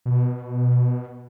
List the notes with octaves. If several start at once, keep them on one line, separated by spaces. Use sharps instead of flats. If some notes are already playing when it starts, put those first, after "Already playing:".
B2